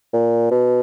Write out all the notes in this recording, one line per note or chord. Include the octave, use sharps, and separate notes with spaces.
A#2
B2